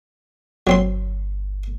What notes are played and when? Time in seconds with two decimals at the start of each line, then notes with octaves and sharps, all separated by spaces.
0.67 G1 F#3 C4 C6